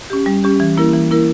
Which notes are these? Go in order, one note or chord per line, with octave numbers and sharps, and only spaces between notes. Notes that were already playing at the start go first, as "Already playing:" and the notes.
C#4 G4
G3
C#4 G4
E3
A#3 E4 A#4
E3
A#3 E4 A#4